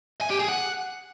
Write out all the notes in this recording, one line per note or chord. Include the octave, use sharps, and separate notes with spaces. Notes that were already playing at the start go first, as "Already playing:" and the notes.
G#5
G4
G#4
F#5